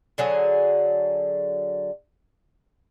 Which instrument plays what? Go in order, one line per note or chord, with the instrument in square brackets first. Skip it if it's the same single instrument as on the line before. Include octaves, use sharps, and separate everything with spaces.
[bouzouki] D3 F#3 G#4